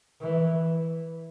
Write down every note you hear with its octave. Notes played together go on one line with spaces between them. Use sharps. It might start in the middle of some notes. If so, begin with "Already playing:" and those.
E3